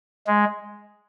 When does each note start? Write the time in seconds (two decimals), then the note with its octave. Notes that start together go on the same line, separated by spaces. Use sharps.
0.27 G#3